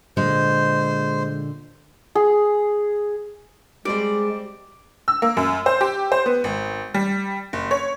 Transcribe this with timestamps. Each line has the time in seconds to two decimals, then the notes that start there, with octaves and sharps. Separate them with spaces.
0.17 A#2 D3 G#3 C5
2.15 G#4
3.85 G3 G#3 C4 C5 D5
5.08 E6
5.22 A#3
5.37 F#2
5.66 C5
5.81 G4
6.12 C5
6.26 B3
6.44 G#1
6.94 G3
7.53 F#1
7.71 C#5